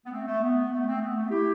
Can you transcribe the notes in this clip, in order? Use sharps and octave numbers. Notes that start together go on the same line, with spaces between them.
B3
A3 C4
A3
B3
A3
A3 C4
B3
A3
E4 G4